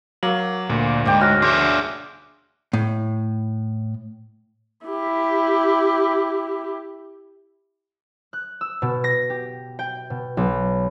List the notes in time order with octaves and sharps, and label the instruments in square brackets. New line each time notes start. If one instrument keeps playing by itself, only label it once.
[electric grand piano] F#3 [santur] A#3 [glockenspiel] F#7
[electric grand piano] D2 [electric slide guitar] A#2
[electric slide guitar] G#2 [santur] D5 G5
[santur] F#3 [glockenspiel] F6 F#6 A#6
[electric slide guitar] D4 G#4 E5 [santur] C5 [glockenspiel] D6
[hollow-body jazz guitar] A2
[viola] E4 G4
[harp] F#6
E6
B2
A#6
G4
G5
B2
B1